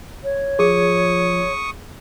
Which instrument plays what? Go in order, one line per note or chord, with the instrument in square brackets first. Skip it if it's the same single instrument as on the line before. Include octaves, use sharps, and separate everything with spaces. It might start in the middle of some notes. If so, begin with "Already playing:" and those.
[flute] C#5
[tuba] F3 [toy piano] G#4 [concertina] C#6 D#6